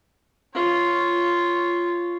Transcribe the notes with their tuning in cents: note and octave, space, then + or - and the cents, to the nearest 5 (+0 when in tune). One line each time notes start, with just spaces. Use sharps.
F4 -10 C#5 +0